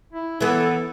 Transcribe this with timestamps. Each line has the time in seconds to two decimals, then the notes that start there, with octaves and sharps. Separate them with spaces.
0.13 E4
0.41 E3 B3 A4